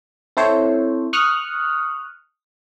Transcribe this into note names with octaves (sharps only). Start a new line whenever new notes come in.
C4 E4 A4 C5 C#5
C#6 D#6 F6 F#6